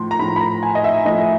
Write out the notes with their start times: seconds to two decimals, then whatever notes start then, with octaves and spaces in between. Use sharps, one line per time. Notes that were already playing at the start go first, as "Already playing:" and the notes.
Already playing: A2 F3 C6
0.11 A#5
0.19 A2 F3 B5
0.36 B5
0.41 A#5
0.63 G#5
0.75 D#5
0.84 E5
1.05 A2 F3 D#5